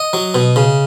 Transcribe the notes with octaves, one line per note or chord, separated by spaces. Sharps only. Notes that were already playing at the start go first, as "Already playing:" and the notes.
Already playing: D#5
F#3
B2
C#3